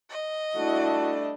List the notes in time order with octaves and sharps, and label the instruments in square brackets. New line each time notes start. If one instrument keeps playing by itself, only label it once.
[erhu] D#5
[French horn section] G3 A3 D4 [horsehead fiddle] E4 F#4